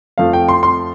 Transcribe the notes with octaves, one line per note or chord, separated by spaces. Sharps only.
F2 F3 A3 F5
G5
C6
C6